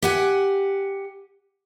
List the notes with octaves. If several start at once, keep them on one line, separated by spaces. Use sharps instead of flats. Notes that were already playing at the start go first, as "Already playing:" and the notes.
G4 F#5 G#5